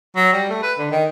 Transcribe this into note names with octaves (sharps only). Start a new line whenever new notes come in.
F#3
G3
A3
B4
D3
D#3